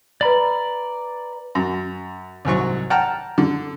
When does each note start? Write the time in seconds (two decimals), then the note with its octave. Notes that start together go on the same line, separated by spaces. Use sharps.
0.21 B4 D5 A#5 B5 F#7
1.55 F#2
2.45 C2 G#2 F#3 C#6
2.90 F#5 G5 A5 A#5 F6
3.38 D3